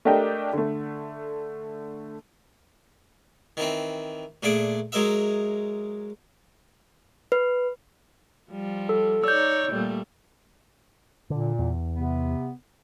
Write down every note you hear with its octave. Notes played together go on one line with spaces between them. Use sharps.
A3 D4 G4 A#4 D#5 G5
D3 A3
D#3 E3 C4
A#2 A3 D4 G#4 D6
F#3 G#3 A#4 D#5 E5
B4
F3 G3
A4
D#4 C#5 D5 E6 G6
A#2 G3 A3
A#2 D3
E2
C3 B3